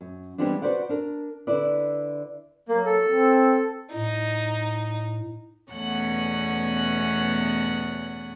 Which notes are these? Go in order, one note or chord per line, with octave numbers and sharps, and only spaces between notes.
F#2
E3 G3 G#3 B3 C4 D4
F#4 G4 B4 C5 D5 F#5
D4 A#4
D3 E4 B4 D5
F#3 A#3
A4
C4
A2 D#4
E2 B2 A3 C#4 F#5 F#6